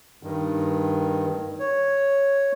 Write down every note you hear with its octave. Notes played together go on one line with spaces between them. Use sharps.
G2 D#3
C#5